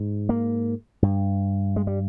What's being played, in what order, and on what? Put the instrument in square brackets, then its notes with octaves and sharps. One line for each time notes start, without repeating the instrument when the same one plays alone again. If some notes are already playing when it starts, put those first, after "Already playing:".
Already playing: [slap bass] G#2
A#3
G2
G#3
G3